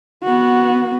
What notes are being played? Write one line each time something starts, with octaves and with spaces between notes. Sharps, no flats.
B3 F#4